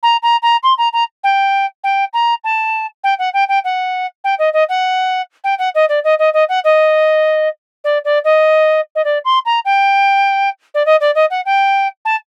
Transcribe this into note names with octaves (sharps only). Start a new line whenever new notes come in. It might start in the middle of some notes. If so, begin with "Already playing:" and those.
A#5
A#5
A#5
C6
A#5
A#5
G5
G5
A#5
A5
G5
F#5
G5
G5
F#5
G5
D#5
D#5
F#5
G5
F#5
D#5
D5
D#5
D#5
D#5
F#5
D#5
D5
D5
D#5
D#5
D5
C6
A#5
G5
D5
D#5
D5
D#5
F#5
G5
A5